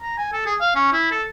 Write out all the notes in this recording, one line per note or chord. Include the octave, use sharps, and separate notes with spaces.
A#5
G#5
A4
G#4
F5
C#4
E4
A4